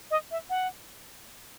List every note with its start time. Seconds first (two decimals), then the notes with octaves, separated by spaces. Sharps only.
0.11 D#5
0.31 E5
0.50 F#5